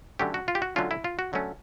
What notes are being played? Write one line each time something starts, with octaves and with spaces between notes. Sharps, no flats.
D3 F#3 A3 C#4 G4
F#4
F4
G4
F#4
D3 F#3 A3 C#4 F4
E4
F4
F#4
D3 F#3 A3 C#4